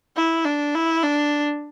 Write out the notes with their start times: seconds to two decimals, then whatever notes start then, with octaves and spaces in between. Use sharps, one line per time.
0.16 E4
0.45 D4
0.75 E4
1.03 D4